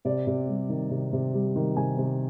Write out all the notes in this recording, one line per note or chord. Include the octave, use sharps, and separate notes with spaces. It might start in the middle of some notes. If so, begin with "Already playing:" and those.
C3 D5
C3
G3
D#3
C3
C3
G3
D#3
C3 G#5
C3